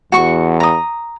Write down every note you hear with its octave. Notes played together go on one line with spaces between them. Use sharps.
E2 F#4 C#6
A#5 D#6